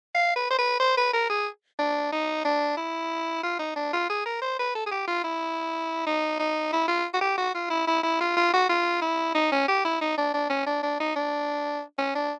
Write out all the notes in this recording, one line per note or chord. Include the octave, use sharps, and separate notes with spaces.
F5
B4
C5
B4
C5
B4
A#4
G#4
D4
D#4
D4
E4
F4
D#4
D4
F4
G#4
A#4
C5
B4
A4
G#4
G4
F4
E4
D#4
D#4
E4
F4
F#4
G4
F#4
F4
E4
E4
E4
F4
F4
F#4
F4
E4
D#4
C#4
G4
E4
D#4
D4
D4
C#4
D4
D4
D#4
D4
C#4
D4